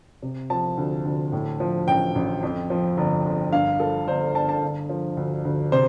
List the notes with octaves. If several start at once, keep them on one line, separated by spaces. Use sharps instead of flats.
C3
F3 A5
D2
D2
A2
F3
A1 G5
A1
F2
F3
G1
G1
G2 F5
F3 A4
G1 C5
G1 A5
A5
D3
F3
D2
D2
C3 C5